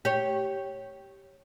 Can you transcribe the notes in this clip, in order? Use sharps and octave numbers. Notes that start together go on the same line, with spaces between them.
G4 C#5